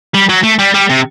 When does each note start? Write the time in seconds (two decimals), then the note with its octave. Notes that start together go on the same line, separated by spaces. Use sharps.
0.14 G3
0.29 F#3
0.44 A3
0.59 G3
0.74 G3
0.90 C3